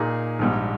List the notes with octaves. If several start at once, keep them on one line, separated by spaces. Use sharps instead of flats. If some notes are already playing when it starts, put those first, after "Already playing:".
Already playing: A#2 A#3 D#4 G#4
A#1 G#2 G3